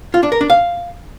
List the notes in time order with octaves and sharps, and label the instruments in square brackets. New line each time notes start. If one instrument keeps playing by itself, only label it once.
[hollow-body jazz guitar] F4
D4
A#4
D4
F5